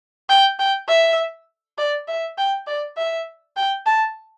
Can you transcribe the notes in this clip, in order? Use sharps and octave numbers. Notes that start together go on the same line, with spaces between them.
G5
G5
E5
D5
E5
G5
D5
E5
G5
A5